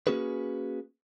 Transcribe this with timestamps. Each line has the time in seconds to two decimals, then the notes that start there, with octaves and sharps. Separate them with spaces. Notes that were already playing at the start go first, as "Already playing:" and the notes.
0.07 A#3 C#4 F#4 G#4 B4